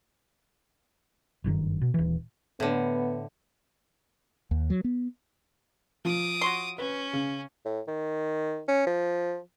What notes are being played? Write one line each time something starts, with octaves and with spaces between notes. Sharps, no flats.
F#1 G2 D3 D#3
B2
D#1 E3
A2 D3 B3
D#2
F#3
B3
F3 D6 D#6
F#4 C#5 C6
C#4 B4
C#3
A2
D#3
C#4
F3